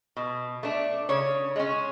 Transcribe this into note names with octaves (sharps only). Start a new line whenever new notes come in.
B2
A3 D4
C#3 C#5
G#3 C#4